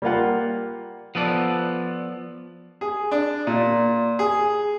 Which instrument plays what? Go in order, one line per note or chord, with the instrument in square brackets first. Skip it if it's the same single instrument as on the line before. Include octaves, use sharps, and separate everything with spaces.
[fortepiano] G3 A#3 F4 F#5
[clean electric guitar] F3 B3 A4 D5
[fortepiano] G#4
D4
A#2
G#4